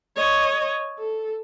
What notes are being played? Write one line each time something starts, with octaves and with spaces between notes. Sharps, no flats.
C#5 D#5
A4